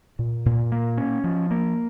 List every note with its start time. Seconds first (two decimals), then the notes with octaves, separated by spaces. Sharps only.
0.19 A#2
0.46 A#2
0.72 A#3
0.97 C#4
1.24 F3
1.51 A#3